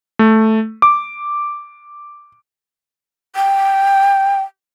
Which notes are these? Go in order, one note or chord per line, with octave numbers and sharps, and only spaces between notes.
A3
D6
G5